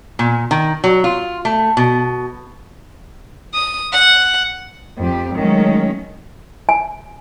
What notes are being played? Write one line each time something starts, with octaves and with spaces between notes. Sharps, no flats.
A#2
D#3
F#3
F4
A3
B2
D#6
F#5
F2 G4
D#3 F#3 G#3 A3 C#4
G#5